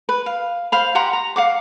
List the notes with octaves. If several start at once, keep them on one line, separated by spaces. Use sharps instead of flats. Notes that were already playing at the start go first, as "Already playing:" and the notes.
B4
F5
C5 F5 B5
G4 F#5 A#5 C6
A#5
F5 F#5 D6